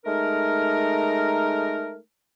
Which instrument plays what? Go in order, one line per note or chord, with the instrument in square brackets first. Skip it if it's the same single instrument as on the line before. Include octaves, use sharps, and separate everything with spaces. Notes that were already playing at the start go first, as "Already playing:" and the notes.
[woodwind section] G#3 A3 D#4 A#4